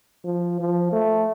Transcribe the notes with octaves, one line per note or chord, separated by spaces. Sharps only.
F3
F3
A3